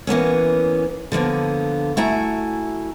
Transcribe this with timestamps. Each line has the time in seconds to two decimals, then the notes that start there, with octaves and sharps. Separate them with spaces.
0.07 E3 A#3 B3 C#4
1.12 D3 F3 A#3 B3
1.97 A3 E4 F#4 G#5 A#5